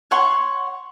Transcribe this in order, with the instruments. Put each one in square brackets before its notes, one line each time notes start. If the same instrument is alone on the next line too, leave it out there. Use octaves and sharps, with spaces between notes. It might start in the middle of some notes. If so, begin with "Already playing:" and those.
[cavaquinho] C#5 F#5 C6 C#6